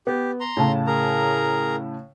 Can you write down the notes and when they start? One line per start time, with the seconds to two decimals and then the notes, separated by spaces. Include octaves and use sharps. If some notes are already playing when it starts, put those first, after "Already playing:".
0.07 B3 G4
0.40 A#5 C6
0.57 A2 C#3 A5
0.87 G#4 A#4 A#5